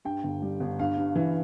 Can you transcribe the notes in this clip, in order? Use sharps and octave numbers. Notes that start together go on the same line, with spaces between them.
G2 G5
G1
G3
G1
G2 F5
G2
E3